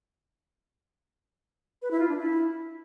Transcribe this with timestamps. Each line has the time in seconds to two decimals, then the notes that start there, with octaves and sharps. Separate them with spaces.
1.82 B4
1.91 E4
2.00 F4
2.08 D4
2.17 E4